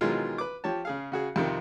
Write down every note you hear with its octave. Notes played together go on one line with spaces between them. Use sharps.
B2 D#3 E3 F#3 G#3 F4
B4 D6
F3 G4 C#5 A5
C#3 G#4 F5
C#3 F#4 G#4
F2 C3 D#3